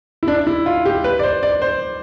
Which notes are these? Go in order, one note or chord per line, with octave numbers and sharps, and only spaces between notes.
E4
D4
E4
F4
G4
B4
D5
C5
D5
C5